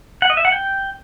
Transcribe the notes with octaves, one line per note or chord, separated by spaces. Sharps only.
F#5
D#5
E5
F#5
G5